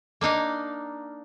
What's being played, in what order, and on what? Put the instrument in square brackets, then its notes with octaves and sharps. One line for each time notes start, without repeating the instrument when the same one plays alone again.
[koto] A#3 D4 D#4 F5